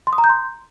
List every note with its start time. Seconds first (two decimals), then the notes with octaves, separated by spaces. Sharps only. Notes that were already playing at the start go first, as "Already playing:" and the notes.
0.07 C6
0.13 D#6
0.18 A#5
0.24 G6
0.29 C6